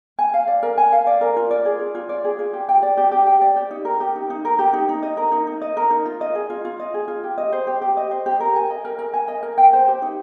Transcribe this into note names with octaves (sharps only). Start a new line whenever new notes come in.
G#5
F5
D5
A#4
G#5
F5
D5
A#4
F4
D5
G#4
F4
F4
D5
G#4
F4
G4
G5
D5
G4
G4
G5
D5
G4
D#4
A#4
G4
D#4
D#4
A#4
G4
D#4
D#4
D#5
A#4
D#4
D#4
D#5
A#4
D#4
F4
D#5
G#4
F4
F4
D#5
G#4
F4
G4
D#5
C5
G4
G4
D#5
C5
G4
A#4
G#5
D#5
A#4
A#4
G#5
D#5
A#4
G5
C5
G4
D#4